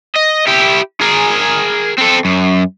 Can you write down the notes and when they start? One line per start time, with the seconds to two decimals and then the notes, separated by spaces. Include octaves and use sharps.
0.16 D#5
0.47 E4 G4
1.01 G#4 A#4
1.98 C4 A4
2.25 F#2